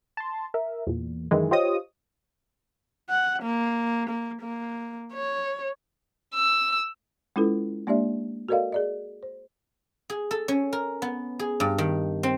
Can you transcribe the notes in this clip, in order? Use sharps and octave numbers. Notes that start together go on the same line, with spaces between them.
A5 C6
A#4 E5
E2 A#2
F#2 D#3 E3 G#3
F4 G4 C5 C#5 D#5 D#6
F#5
A#3
A#3
A#3
C#5
E6
G#3 C#4 E4 F4 A4 B4
G#3 A#3 D4 G4 D5 E5
F#4 A4 A#4 D5 D#5 F5
G#4 D5 D#5
C5
G#4
A4
C#4
A#4
B3
G#4
G2
D#3
C4